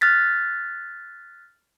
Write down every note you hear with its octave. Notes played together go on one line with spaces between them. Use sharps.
F6 F#6 A6 B6